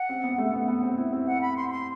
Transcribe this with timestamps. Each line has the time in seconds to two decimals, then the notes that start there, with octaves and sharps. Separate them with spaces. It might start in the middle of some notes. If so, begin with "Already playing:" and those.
Already playing: F#5
0.09 C4
0.24 B3
0.38 A3
0.53 B3
0.68 B3
0.83 C4
0.97 E4
1.12 C4
1.27 F#5
1.41 B5
1.56 C6
1.68 B5
1.71 C6